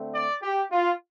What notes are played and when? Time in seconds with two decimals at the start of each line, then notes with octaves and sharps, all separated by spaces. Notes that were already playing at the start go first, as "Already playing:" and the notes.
Already playing: D3 A3 C4
0.14 D5
0.43 G4
0.71 F4